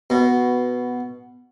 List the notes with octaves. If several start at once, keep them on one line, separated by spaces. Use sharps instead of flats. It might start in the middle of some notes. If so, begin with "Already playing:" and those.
B2